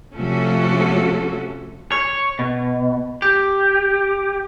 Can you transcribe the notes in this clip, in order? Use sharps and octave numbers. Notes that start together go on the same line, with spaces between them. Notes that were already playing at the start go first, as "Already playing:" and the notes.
C3 F3 A3 C#4 F#4 A4
C#5
B2
G4